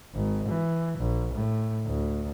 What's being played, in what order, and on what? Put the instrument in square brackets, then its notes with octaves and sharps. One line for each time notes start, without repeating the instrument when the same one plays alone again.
[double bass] G#1
E3
A#1
A2
D2